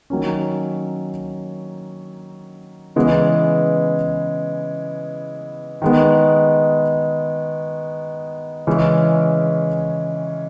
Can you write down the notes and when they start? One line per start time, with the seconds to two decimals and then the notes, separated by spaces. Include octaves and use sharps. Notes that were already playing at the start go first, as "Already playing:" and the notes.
0.10 D#3 F#3 A#3 C#4
2.96 C#3 E3 G#3 B3
5.82 D#3 G#3 B3
8.67 C#3 E3 G#3 C#4